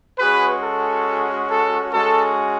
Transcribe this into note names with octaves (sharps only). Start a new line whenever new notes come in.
G#3 C#4 F#4 G#4 B4
A4
A4
G#3 C#4 F#4 A4